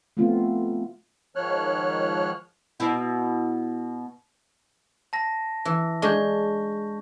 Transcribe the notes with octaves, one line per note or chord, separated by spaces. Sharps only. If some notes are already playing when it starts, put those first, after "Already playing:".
A3 B3 C4 F4
G#2 D#3 F3 C#5 F6 F#6
B2 E4
A5 A#6
E3
G#3 D4 C#6 G6